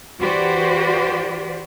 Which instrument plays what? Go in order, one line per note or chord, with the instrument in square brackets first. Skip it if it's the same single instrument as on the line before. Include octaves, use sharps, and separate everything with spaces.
[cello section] E3 F#4 G4 B4 C5 D5